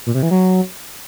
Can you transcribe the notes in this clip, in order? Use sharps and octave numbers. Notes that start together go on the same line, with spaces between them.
A#2
C3
E3
F#3